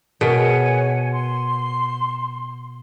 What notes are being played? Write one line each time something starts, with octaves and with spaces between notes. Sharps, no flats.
B2 G#4 A#4 C#5 F#5 G#5
C6